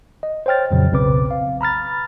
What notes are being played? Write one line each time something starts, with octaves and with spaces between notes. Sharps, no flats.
D#5
C5 C#5 G5 F6 A6
F2 A#2 C#3 F#3
B1 C#3 C4 B4 D6
F5
A#5 B5 F6 A6